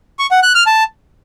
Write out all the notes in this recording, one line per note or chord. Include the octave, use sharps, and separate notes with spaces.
C#6
F#5
F#6
F6
A5